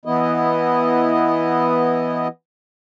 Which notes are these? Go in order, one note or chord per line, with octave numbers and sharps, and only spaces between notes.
E3 B3 E4 D#5